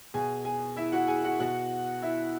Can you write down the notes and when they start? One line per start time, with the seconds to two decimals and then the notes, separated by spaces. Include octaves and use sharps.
0.14 B2 G#4 G#5
0.45 G#4 G#5
0.76 E4 E5
0.92 F#4 F#5
1.08 G#4 G#5
1.24 F#4 F#5
1.40 B2 F#4 F#5
2.02 E4 E5